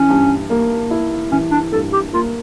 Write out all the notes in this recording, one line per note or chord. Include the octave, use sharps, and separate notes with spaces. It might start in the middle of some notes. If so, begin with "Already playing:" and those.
Already playing: E3 C#4
G2
A#3
E4
E3 C#4
D4
G2 A4
G4
A#3 F4